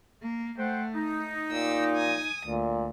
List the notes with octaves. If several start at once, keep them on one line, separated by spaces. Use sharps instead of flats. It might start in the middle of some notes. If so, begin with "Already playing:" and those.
A#3
A3 C5 F#5 G5
D#4
A#2 G4 E6
G#5 D#6
D2 A#2